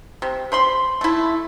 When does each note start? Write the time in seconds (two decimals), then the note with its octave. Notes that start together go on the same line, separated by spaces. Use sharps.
0.22 C3
0.52 C5 B5 C6
1.01 A3 E4